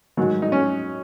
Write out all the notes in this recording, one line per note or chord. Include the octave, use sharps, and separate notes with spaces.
G#2 D#3 F#3
D#4
C#4